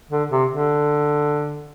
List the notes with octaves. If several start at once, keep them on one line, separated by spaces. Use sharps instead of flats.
D3
C3
D3